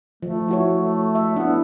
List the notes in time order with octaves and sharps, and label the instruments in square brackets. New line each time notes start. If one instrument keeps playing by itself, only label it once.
[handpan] F3 [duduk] A3
[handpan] E4 F#4 C#5
[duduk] A3
[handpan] E5
[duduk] B3 [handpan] D4 E4